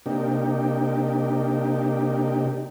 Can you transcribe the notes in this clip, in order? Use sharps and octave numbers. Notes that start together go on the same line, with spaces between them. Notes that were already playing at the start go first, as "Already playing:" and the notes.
C3 A#3 D4 D#4 G4